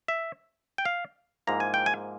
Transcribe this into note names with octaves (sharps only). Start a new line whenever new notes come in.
E5
G5
F5
G#2 F3 A#3 E4 A#5
G#5
G5
G#5